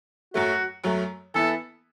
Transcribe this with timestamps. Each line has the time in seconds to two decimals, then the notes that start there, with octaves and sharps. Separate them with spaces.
0.34 F#2 F#3 A3 F#4
0.84 F#2 F#3 A3
1.34 E3 B3 E4 A4